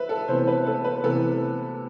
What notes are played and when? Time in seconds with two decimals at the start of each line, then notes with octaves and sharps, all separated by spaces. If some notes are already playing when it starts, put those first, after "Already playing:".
Already playing: B4 E5
0.09 A4
0.28 C3 E3 B3 C5
0.47 B4
0.66 A4
0.84 B4
1.03 C3 E3 B3 A4